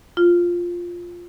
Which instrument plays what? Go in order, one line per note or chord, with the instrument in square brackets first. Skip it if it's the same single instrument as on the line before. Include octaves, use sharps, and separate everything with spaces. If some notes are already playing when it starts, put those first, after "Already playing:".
[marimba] F4